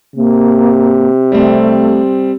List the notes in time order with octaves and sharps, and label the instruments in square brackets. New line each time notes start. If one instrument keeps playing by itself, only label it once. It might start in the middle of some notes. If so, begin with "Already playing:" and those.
[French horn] C3 [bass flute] A#3
[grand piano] G3 C4 [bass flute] A3